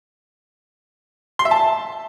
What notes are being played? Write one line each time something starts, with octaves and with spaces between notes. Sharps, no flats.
C6
E5
A5